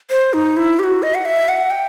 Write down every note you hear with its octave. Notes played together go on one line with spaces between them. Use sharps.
C5
D#4
E4
G4
F#4
D#5
F#5
E5
F#5
G5